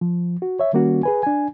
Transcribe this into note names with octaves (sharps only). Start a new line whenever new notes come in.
F3
F#4
C#5 E5
D#3 G3 A#3 C#4 F#4
G#4 B4 G#5
D4 G#5